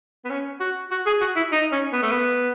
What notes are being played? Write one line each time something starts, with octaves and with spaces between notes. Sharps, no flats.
B3
C#4
F#4
F#4
G#4
F#4
E4
D#4
C#4
B3
A3
B3